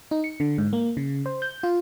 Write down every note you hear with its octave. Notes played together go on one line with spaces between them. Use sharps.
D#4
C#7
D3
G#2
A#3
C#3
C5
G6
F4